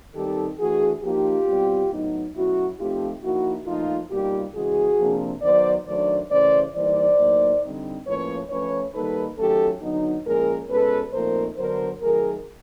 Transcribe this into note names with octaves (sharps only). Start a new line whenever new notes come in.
D#3 G3 C4 D#4 G4 A4
E3 A3 D4 F#4 G#4
F3 A#3 D#4 F4 G4
B2 G3 C4
A2 F#3 B3 D#4
B2 F#3 A3 C#4 E4 F#4
F3 A3 C4 D#4 F4 G4
F3 A#3 D#4 E4 F#4
A#2 F3 A3 D#4 F4
B2 G3 A#3 D#4 F4 G4
C#3 E3 G#3 F#4 G#4
C3 F3 A#3 D4
D#3 F#3 B3 C5 D5
D#3 F#3 A3 D4 C5 D5
C#3 E3 A3 C#4 C5 D5
E3 G3 A#3 D#4 C5 D5
A2 F#3 A#3 D#4
D3 G3 C4 D#4
A2 F3 A#3 C#4 B4 C#5
F3 A3 C#4 B4 C#5
D#3 G3 A#3 D#4 A4 B4
D#3 F#3 A3 C#4 G4 A4
D3 F#3 B3 D#4
A#2 F3 G#3 C#4 G#4 A#4
B2 G#3 C#4 A4 B4
A#2 F3 A3 C4 D#4 A#4 C5
D3 F#3 B3 D4 A#4 C5
D#3 F#3 A3 G#4 A#4